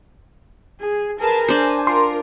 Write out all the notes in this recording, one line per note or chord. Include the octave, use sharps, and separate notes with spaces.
G#4
G#4 A#4 B4 A5
D4 C5 G#5
F4 A#4 C6